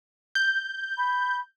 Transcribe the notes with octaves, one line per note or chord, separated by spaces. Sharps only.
G6
B5